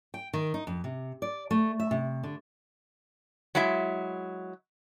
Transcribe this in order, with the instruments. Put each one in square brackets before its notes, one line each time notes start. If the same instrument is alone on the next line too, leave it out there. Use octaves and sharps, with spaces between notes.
[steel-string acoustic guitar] G5
D#3
D#4
F2
C3
D5
A3
E5
C3
D3
[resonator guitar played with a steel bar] F#3 G#3 E4 E5